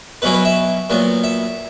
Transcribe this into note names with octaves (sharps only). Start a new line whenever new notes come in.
B2 F#3 C#4 E4 B4
B4
E5
A#2 F#3 B3
E5